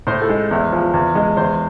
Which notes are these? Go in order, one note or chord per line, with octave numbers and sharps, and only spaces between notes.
A2 C5
A4
G#3
E2
F3
E2
G#3
E2 C5